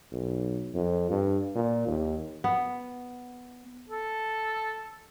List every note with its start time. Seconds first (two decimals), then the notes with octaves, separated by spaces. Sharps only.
0.12 B1
0.74 F2
1.10 G2
1.55 A#2
1.87 D#2
2.44 B3
3.90 A4